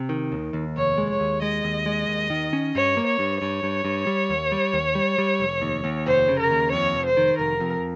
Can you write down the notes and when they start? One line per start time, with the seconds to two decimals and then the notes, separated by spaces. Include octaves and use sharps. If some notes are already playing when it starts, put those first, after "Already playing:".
Already playing: C3
0.09 D#3
0.32 D#2
0.53 D#2
0.76 F1 C#5
0.98 G#3
1.09 C#5
1.20 D#2
1.42 G#3 D#5
1.64 D#2
1.86 G#3
2.08 D#2
2.30 D#3
2.53 C#4
2.74 G2 C#5
2.97 A#3
3.07 C#5
3.19 G2
3.41 G2 C#5
3.63 G2
3.85 G2
4.07 G3
4.30 D#2
4.52 G3
4.73 D#2
4.95 G3
5.18 G3
5.40 F1
5.62 D#2
5.84 D#2
6.06 F1 C5
6.28 C#3
6.39 A#4
6.50 D#2
6.72 F2 C#5
6.94 F1
7.06 C5
7.17 D#3
7.39 F1 A#4
7.60 F2